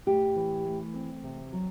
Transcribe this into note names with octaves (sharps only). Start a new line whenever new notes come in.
A2 G4
E3
A3
C4
C3
F#3